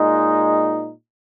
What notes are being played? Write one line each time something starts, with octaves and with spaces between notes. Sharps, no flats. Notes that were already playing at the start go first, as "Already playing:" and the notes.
Already playing: A#2 G#3 D#4